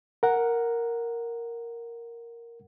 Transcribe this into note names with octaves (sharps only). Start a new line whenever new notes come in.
A#4 F#5